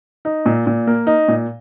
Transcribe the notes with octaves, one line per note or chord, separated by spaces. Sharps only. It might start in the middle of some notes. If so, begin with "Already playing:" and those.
D#4
A#2
A#2
A#3
D#4
A#2